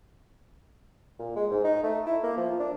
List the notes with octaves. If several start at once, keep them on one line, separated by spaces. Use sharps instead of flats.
A#2
G#3
G#2
D#4
A3
E4
A#3
F3
D4